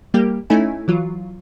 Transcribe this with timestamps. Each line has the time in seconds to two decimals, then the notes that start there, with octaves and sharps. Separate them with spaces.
0.14 G3 A#3 G4
0.50 A3 C#4 D#4 E4 G#5
0.88 E3 F#3 F4